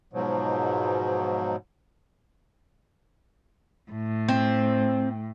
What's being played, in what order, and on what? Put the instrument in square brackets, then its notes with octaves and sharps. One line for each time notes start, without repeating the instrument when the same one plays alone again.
[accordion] G#2 B2 F3 F#3
[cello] A2
[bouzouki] C4